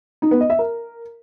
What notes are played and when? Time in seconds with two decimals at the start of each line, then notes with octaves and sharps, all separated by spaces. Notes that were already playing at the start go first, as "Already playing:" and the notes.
0.22 D#4
0.31 B3
0.40 D#5
0.50 E5
0.59 A#4